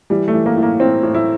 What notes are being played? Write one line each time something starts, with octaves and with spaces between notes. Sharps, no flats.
E3 G3
A3
E3
A#3
A2
A#3
A2 C4
A2
E4